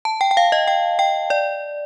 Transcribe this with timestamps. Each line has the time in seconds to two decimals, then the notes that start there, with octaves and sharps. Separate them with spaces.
0.05 A5
0.21 G5
0.31 G5
0.37 F5
0.52 D#5
0.67 G5
0.99 G5
1.30 D5